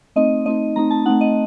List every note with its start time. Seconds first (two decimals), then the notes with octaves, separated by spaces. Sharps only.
0.16 A3 C4 D#4 D#5
0.46 A3 C4 D#4 D#5
0.76 A3 C4 D#4 A#5
0.91 A5
1.06 A3 C4 D#4 F#5
1.21 D#5